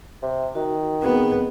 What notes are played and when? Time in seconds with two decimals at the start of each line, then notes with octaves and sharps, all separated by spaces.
0.22 C3
0.55 D#3 F#4
1.02 B3 C4 G#4